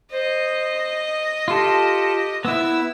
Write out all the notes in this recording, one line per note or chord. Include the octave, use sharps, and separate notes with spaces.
C5 D#5
F4 G4 A4
B3 E4 E6